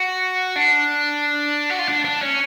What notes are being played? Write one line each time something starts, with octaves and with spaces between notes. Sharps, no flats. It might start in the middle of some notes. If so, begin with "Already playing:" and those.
Already playing: F#4
D4
F#4
F4
D4
D4
C#4